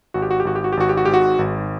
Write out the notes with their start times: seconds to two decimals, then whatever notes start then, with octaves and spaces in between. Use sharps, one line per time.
0.14 G#1 F#4
0.22 G4
0.31 F#4
0.40 G4
0.45 G#1 F#4
0.55 G4
0.64 F#4
0.72 G4
0.77 G#1 F#4
0.89 G4
0.97 F#4
1.05 G#2 G4
1.14 F#4
1.39 G#1